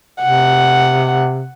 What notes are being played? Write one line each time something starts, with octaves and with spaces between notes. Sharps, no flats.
C3 F#5